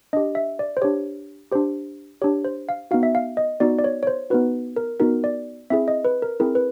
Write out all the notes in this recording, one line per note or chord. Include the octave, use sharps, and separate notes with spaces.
D4 G4 D#5
E5
D5
C5
D4 G4 C#5
D4 G4 C5
D4 G4 C#5
C5
F5
B3 D#4 F#4 F5
E5
F5
D#5
B3 D#4 F#4 D5
D5
C#5
C#5
C5
B3 D#4 F#4 B4
A#4
B3 D#4 F#4 A#4
D5
C4 E4 G#4 E5
D#5
B4
A#4
C4 E4 G#4 A#4
B4